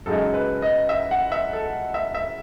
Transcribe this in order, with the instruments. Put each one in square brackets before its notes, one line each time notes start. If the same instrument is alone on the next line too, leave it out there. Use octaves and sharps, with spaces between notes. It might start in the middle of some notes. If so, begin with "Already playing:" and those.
[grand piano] F#2 C#3 G#3 D#4 A4
B4
D#5
E5
F#5
E5
A4
E5
E5